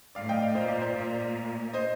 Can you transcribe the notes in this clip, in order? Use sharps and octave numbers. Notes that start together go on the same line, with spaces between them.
A2 D5 F5
D#5 G5
D5 F5
A#2 C5 D#5
D5
C5
A#2 D5
C5 D#5